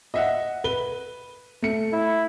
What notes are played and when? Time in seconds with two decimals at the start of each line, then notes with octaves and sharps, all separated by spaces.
0.14 D#5 E5 F#5
0.64 B4 G7
1.62 A3 C#7
1.92 E4